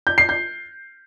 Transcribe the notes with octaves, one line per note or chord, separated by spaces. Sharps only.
G6
C7
G6